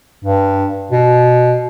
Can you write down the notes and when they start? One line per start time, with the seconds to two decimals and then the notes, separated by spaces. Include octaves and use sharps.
0.24 G2
0.91 B2